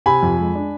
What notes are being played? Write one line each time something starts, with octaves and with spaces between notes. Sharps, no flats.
C3 G#5 B5
F2
G#3
D4